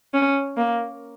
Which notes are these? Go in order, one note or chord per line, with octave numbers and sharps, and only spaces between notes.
C#4
A#3